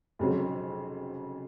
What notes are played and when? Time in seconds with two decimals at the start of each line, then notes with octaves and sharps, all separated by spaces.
0.19 F1 F2 C#3 F#3